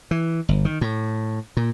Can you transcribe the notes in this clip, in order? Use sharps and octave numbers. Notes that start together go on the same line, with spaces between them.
E3
G1
D#3
A2
A#2